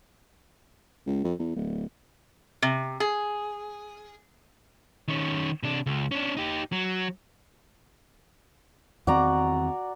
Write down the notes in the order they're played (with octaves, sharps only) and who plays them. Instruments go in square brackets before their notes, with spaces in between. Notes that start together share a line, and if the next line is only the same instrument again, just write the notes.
[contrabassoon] C#2
F2
E2
D1
[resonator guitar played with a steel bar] C3
G#4
[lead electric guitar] D#3 C#4
C3 D4
C#2
C#4 D4
D#4 G4
F#3
[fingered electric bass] E2 D#3 C4 [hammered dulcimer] F#4 D5 A#5